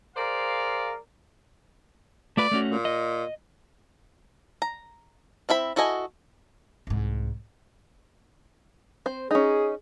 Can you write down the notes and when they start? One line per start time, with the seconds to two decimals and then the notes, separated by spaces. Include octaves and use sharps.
0.16 G#4 A#4 C5 D5 F5
2.37 A3 F4 B4 D5
2.51 A3 C#4 F#4
2.70 A#2
2.85 D#5
4.62 A#5
5.49 C4 E4 E5 B5
5.76 E4 F#4 A4 D#5 G#5
6.87 C2 G#2
9.06 C4 C5
9.31 C#4 D#4 G#4